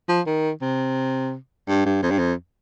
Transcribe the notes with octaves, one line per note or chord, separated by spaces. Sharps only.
F3
D#3
C3
G2
G2
F2
G2
F2